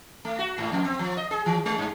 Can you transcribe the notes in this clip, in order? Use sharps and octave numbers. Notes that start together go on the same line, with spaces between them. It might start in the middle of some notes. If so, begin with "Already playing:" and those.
A3
F#4
G#2
F2
C4
F3
D#5
G#4
E3
G#3
G2